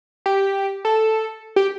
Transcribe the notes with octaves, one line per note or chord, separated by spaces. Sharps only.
G4
A4
G4